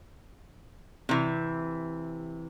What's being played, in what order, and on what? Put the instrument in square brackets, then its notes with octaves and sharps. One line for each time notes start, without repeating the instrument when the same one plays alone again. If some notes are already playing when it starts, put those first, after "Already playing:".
[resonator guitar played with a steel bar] C3 E3